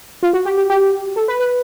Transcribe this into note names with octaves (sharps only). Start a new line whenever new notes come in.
F4
F#4
G4
G4
G4
A4
B4
B4